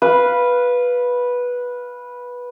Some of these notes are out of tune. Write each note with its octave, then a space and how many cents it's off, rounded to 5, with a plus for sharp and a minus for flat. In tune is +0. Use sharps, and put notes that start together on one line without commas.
B4 -10 F5 +0